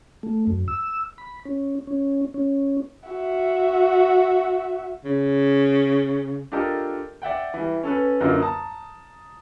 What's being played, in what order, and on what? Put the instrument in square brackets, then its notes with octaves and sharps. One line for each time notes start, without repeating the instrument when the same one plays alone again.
[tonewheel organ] A3
F#2
E6
B5
C#4
C#4
C#4
[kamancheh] F#4 E5
[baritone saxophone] C#3
[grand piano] D4 F4 G4 A4 A#4 D#5
D5 E5 F#5 G5
E3 G3
C#4 A4 B4
F#2 D3 F#3 A#3 D#4 F4
A5 A#5 D#6